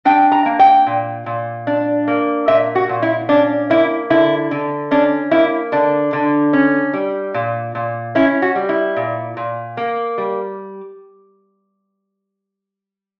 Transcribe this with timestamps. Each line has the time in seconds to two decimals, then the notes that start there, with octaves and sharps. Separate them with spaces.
0.05 D4 G5
0.32 A#5
0.46 A#3
0.59 G5
0.87 A#2
1.26 A#2
1.67 D4
2.08 A#3
2.48 A#2 E5
2.75 F#4
2.89 A#2
3.02 E4
3.29 C#4 D4
3.70 A#3 E4
4.10 D3 E4
4.51 D3
4.91 C#4 D4
5.31 A#3 E4
5.72 D3 D4
6.13 D3
6.53 C#4
6.93 G3
7.34 A#2
7.75 A#2
8.15 C#4 E4
8.42 F#4
8.55 G3
8.69 E4
8.96 A#2
9.37 A#2
9.77 A#3
10.18 G3